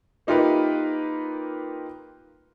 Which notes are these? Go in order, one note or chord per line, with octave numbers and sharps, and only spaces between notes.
A#3 D#4 F4 G4 A#4 B4